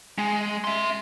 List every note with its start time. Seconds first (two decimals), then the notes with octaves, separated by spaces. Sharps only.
0.18 G#3
0.64 E5 C6